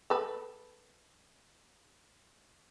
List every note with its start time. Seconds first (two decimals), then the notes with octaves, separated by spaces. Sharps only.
0.10 A4 B4